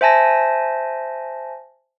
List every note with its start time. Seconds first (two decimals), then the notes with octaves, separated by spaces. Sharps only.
0.01 C5 E5 G#5 A5 A#6